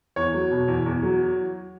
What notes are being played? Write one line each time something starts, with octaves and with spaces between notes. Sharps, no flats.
E2 C#5
F#3
B2
E2
E2
F#3